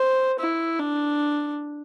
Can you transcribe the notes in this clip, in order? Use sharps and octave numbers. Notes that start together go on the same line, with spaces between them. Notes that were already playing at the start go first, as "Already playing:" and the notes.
Already playing: C5
E4
D4